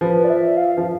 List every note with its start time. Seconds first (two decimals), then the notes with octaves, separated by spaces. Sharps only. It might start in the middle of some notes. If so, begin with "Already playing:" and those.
0.01 F3 B4
0.24 D5
0.30 E5
0.57 F5
0.77 F3